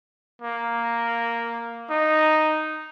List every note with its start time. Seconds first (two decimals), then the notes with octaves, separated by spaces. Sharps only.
0.42 A#3
1.90 D#4